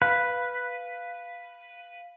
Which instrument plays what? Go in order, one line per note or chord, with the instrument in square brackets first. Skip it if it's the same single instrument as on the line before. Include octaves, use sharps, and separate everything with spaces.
[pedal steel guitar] B4 [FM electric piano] F5